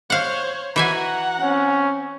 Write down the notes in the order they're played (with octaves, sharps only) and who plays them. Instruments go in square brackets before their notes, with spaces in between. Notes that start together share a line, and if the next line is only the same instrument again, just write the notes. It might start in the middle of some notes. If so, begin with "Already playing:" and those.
[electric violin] C5 C#5 [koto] F5 F#5
[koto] E3 E5 G#5 [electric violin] F#4 [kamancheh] F#5 A#5
[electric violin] C4 [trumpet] C#4